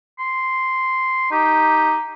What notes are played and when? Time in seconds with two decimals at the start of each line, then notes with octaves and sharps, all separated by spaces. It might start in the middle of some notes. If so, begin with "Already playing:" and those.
0.19 C6
1.32 D#4 G4